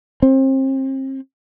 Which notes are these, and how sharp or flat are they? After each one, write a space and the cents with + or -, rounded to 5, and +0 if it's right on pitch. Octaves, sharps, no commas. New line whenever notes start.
C4 +35